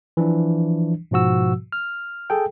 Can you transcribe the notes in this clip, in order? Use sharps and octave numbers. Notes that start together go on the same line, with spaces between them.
E3 F3 D4
G#2 B2 F3 F#4 E6
F6
G#4 A4 G5